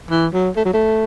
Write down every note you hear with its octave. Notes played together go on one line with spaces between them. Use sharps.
E3
F#3
A3
F#3
A3